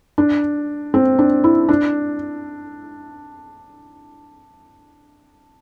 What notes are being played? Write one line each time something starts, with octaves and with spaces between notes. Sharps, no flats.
D4
C4
D4
E4
D4